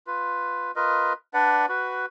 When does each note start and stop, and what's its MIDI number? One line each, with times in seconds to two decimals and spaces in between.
0.07 0.71 65
0.07 0.71 71
0.76 1.13 65
0.76 1.13 70
0.76 1.13 71
0.76 1.13 75
1.34 1.66 62
1.34 1.66 71
1.34 1.66 74
1.34 1.66 78
1.69 2.06 66
1.69 2.06 71